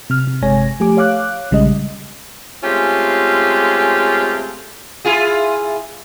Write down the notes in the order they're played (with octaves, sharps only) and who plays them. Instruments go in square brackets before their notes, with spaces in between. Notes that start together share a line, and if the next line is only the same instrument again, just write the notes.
[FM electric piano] C3 F6
C3
G1 C3 G#3 C#5 G#5 A#6
F3 A3 G4 G#5 D6
C#5 F5 D6 F#6
A#1 C#3 G3 G#3 D#5
[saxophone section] G#3 A3 C4 C#4 F4 G4
[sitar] E4 F4 G#4